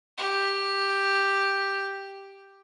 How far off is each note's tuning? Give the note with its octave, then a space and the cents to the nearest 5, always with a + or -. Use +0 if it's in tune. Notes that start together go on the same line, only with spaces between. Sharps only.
G4 +5